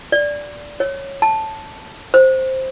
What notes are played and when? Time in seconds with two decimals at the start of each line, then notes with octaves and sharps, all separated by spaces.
0.12 D5
0.80 C#5
1.22 A5
2.14 C5